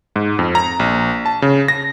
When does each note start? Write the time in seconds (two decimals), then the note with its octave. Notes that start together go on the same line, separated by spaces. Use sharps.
0.16 G#2
0.39 F2
0.55 A#5
0.79 A#1
1.26 A5
1.42 C#3
1.68 A#6